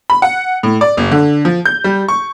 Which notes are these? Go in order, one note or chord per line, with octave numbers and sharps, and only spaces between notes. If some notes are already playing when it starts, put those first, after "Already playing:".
B5
F#5
A2
D5
F#1
D3
F3
G6
G3
C#6